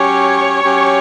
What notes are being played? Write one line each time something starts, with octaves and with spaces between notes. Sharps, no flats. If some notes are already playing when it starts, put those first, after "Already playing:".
Already playing: F#3 C#4 G4 C#5
F#3 C#4 G4